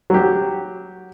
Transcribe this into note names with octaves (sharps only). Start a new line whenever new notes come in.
F#3 G4